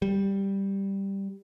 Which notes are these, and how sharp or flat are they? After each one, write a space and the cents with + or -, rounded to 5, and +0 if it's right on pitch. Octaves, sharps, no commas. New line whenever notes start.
G3 +0